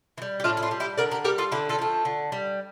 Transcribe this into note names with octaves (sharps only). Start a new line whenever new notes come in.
E3
G3
G4
A2 D4 F4
E4
D4 F4
G3
E4 G4
D3 A#4 D5
G4 A#4
G3 G4 A#4
F4 A4
D3 E4 G4
F4 A4
F3 A3
D3
G3